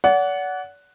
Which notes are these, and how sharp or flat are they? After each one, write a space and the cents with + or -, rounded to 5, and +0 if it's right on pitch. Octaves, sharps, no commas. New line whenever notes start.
D5 -40 F#5 +0